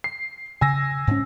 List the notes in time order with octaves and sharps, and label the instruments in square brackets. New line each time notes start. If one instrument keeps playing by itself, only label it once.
[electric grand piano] C7
[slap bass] C#3 [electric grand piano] G#5 E6 A#6
[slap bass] G#2 C#4